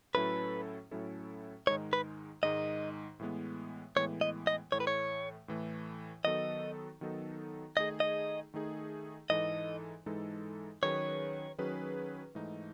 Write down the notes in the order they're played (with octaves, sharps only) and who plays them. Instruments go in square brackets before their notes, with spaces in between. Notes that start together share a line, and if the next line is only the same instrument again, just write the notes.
[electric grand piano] A2 F#3 C#4 E4 A4 [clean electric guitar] B4
[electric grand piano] A2 F#3 C#4 E4 A4
[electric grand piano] G#2 D#3 G#3 D#4 [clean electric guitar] C#5
[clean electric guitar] B4
[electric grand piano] G#2 D#3 G#3 D#4 [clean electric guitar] D#5
[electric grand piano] A2 E3 G#3 B3
[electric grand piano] A2 E3 G#3 B3 [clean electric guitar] C#5
[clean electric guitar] D#5
D#5
[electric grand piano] A2 E3 A3 [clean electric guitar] C#5
[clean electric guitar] B4
C#5
[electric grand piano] A2 E3 A3
[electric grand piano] D#3 F#3 B3 D#4 A4 [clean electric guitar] D#5
[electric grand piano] D#3 F#3 B3 D#4 A4
[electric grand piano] D#3 A3 D#4 G#4 [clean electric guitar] D#5
[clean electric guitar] D#5
[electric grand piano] D#3 A3 D#4 G#4
[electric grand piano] G#2 E3 G#3 D#4 A4 [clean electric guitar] D#5
[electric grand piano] G#2 E3 G#3 D#4 A4
[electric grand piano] D#3 F#3 C#4 G#4 B4 [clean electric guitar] C#5
[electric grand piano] D#3 F#3 C#4 G#4 B4
G#2 E3 A3 D#4